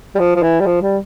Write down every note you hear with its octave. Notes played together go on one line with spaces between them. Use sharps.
G3
F3
F3
E3
G3
F3
G3